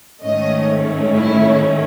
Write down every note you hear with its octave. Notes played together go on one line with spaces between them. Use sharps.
G#2 D#3 A3 C#4 D#5
E4